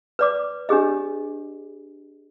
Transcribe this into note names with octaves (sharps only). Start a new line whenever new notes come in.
B4 D5 D6
D4 G4 G#4 D#5